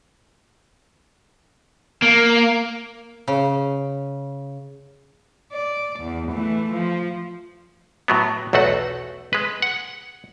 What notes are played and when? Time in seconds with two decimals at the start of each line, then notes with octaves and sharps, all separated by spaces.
2.02 A#3
3.28 C#3
5.52 D5
6.00 E2
6.32 E3 A3
6.72 F3
8.08 A2 F#3 B3
8.53 B1 E2 A3 F#4 F#5
9.33 G#3 B4
9.62 F#5